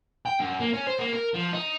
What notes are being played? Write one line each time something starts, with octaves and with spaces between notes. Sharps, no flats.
G5
F#2
A#3
C#4
C5
A#3
A#4
F3
D#4